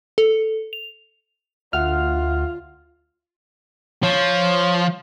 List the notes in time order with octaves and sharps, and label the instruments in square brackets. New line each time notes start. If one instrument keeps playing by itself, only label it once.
[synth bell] A4
F7
[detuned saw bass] D2 [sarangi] F4 [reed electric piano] E5 F#5 [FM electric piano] F6
[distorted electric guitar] F3 [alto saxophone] C#5